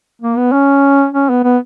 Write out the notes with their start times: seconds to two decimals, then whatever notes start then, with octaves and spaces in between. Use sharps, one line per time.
0.22 A#3
0.37 B3
0.52 C#4
1.13 C#4
1.29 B3
1.44 B3